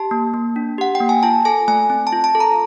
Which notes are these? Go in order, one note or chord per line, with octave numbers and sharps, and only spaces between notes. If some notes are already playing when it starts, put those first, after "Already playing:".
Already playing: G4 A5
A#3
A#3
D4
G4 F#5
G5
A#3
G#5
F4 A5
A4 G#5
A3 G#5
C4
A5
F4
A5
A4
A#5